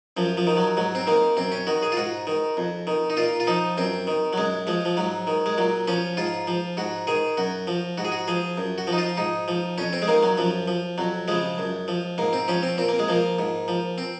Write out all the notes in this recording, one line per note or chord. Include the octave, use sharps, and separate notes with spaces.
F#2 F3
F3
D#3
F#3
G#2 F#3
C4
D#3 A#3
F#2 C4
C#4
D#3 F#4
G#4
F4
G#2 F#4
D#3
F2
D#3
D#4
A#2 F4
F4
F3 D#4
F#2 C4
D#3
F#3
F#2 G#3
F3 G#3
F3
G#2 F#3
D#3
G#3
A#2 F#3
F3 C#4
G#2 F4
F3
G#2 F#4
D#3 G#4
F#2 F#4
F3
G#2 F#4
G#4
F#4
F3 G#4
F#2
F#4
F3
D#4
F4
G#2 D#4
F3
F2 C#4
C4
G#3
D#3 A#3
F#3
F#2 F3
F3
F2 F#3
C#3 F3 G#3
F#2
F3
G#2 A#3
C4
F3 C#4
C4
A#2 C4
A#3
G#3
F3 A#3
G#2
F3
C4